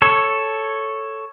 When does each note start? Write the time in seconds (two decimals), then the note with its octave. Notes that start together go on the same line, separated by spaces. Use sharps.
0.02 A4 C#5